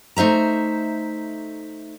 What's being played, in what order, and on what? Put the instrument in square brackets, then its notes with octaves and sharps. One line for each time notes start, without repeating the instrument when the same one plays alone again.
[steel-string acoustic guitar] A3 D#4 C5 E5 A#5